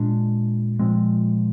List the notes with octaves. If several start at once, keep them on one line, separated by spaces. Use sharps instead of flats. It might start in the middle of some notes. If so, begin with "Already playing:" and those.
Already playing: A#2 G#3 D4
A#2 F3 G#3 C4